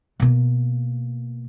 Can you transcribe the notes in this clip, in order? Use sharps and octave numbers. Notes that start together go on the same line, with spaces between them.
B2 A#3